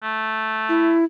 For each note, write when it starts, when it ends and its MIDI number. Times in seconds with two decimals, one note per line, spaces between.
0.03 0.96 57
0.69 1.04 64